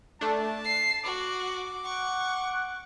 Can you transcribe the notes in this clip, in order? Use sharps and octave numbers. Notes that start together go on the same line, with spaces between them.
A3 D4 A5
C7
F#4 D6
F#5 C#6